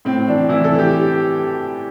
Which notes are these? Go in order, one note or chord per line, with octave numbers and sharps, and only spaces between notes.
A2 C4
E3 D4
E3 E4
A4
E3
G4